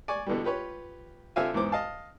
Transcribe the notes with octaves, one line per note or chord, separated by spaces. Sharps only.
D5 G#5 C#6
B2 D3 E3 G3
F4 G4 B4 C#5
D3 C4 F4 E5 F5 G#5
E2 G#2 E3 C5 D6
D#5 F5 A5